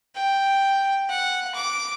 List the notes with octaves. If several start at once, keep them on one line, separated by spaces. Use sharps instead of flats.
G5
F#5
D6